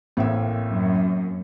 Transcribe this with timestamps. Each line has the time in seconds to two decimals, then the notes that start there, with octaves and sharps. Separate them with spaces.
0.17 A1 A2 A#3 C4 E5
0.70 F#2